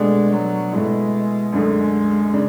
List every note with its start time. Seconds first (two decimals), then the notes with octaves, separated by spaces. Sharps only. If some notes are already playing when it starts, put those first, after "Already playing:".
Already playing: B2 G#3 A3 D4
0.32 F#3
0.73 B2 G#3 A3 E4
1.52 F#2 D3 G#3 A3
2.33 C#3 D4